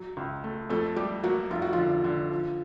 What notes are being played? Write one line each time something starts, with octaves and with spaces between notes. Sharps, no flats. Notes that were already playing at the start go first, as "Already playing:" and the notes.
Already playing: F#3
C#2
A3
F2 A3 A4
G3 G4
F#3 A#3 F#4
F1 F4
F#4
D3 F3 F4
D3
F3